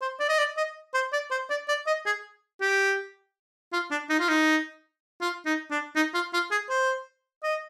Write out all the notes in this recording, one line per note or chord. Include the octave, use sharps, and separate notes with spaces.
C5
D5
D#5
D5
D#5
C5
D5
C5
D5
D5
D#5
G#4
G4
F4
D4
D#4
F4
D#4
F4
D#4
D4
D#4
F4
F4
G#4
C5
D#5